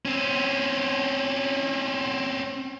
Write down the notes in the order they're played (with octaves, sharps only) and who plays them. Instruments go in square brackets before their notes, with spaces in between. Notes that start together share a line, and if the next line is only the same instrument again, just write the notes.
[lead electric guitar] C4 C#4